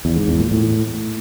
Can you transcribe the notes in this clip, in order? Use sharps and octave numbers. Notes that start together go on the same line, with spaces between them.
E2
G#2
E2
A#2
A2